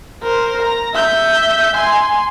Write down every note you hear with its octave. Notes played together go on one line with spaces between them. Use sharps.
A#4 C5
A#5
E5 G6
G#5 C6